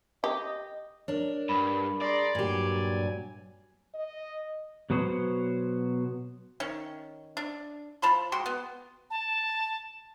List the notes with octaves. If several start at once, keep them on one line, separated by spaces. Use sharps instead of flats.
G4 D#5
D4 A#4 C#5
G2 B5
G#4 D5 A#5 C6
G2 A#2 F#3 G4 G#5
D#5
B2 F#3 B3 C5 C#5
D#3 C#4
D4
F3 A5 B5 C6
G#3 F#4 G5 C6
B3
A5